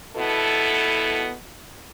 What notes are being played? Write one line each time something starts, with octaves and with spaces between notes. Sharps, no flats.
B2 B3 E4 A4